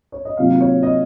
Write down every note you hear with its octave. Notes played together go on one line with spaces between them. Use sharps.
C#5
D#5
C3 D#3 F#3 A#3 F4 F5
C#5
D#5